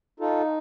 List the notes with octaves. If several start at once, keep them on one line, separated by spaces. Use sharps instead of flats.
D#4 F4 A4